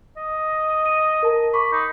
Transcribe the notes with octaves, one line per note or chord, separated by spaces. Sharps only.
D#5
D#7
A#4 A5
B5 C#6 D6
D#4